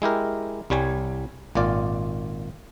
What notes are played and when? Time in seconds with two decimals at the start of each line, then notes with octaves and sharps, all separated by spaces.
0.02 G#3 E4 G4 A#4
0.70 C2 G3 C#5 G#5
1.55 G#1 A#2 F4 D5